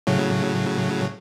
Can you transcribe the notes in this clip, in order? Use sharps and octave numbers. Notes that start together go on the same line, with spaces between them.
A2 C#3 F#3